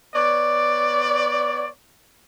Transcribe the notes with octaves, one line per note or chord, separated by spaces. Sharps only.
B3 C#5 D5